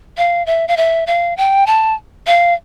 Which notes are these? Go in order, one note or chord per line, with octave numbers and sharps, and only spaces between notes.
F5
E5
F5
E5
F5
G5
A5
F5